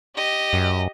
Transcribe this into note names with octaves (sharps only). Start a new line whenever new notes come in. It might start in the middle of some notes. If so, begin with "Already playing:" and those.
G4 D#5
F#2